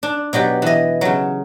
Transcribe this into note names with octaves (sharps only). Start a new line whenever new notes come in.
D4
B2 F#3 G4 D5
E3 D#5
C#3 F#3